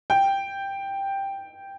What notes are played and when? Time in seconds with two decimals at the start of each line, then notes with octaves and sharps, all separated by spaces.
0.10 G5